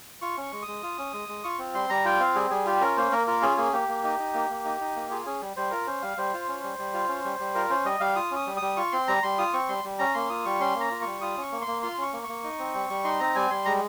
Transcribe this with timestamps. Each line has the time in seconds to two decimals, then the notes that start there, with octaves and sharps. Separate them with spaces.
0.21 F4 C#6
0.37 C#4 C#6
0.52 G#3
0.62 D#6
0.67 G#3
0.83 F4
0.98 C#4
1.13 G#3
1.29 G#3
1.44 F4 C#6
1.59 C4
1.74 G3 C6
1.89 G3 A#5
2.05 F4 G5
2.20 C4 F5
2.35 G3 G#4
2.51 G3 G#4
2.66 F4 G4
2.81 C#4 A#4
2.97 A#3 C5
3.12 A#3 A#4
3.27 F4 A#4
3.42 C#4 G#4
3.57 A#3 G#4
3.73 A#3 G4
3.88 A#3
4.04 D#4
4.19 D#4
4.34 A#3
4.50 A#3
4.65 D#4
4.80 D#4
4.96 A#3
5.11 F4 G#4
5.26 C#4 G#4
5.41 G3
5.57 G3 C5
5.71 F4 A#4
5.87 C#4 C5
6.02 G3 F5
6.18 G3 C5
6.33 F4
6.48 C#4
6.63 G3
6.79 G3
6.94 F4
7.09 C#4
7.25 G3
7.39 G3
7.55 F4 A#4
7.70 C#4 C5
7.85 G3 D#5
8.00 G3 F5
8.16 F4 D#6
8.31 C#4 D#6
8.47 G3
8.57 D#6
8.62 G3
8.77 F4 C#6
8.92 C4 C6
9.08 G3 A#5
9.23 G3 C6
9.38 F4 D#6
9.53 C4 C#6
9.69 G3 C6
9.84 G3
9.99 C#4 A#5
10.14 A#3 C6
10.29 F4 D#6
10.45 G3 C#6
10.60 C#4 C6
10.75 A#3
10.81 A#5
10.91 F4
11.01 C#6
11.06 G3
11.21 F4 D#6
11.37 C#4 C#6
11.52 A#3
11.62 C6
11.67 A#3
11.82 F4 C6
11.98 C#4 C#6
12.13 A#3
12.24 C#6
12.29 A#3
12.44 D#4
12.59 C4
12.74 G3
12.90 G3
13.04 D#4 C6
13.20 C4 A#5
13.35 G3 G#5
13.50 G3 C6
13.65 G#3 A#5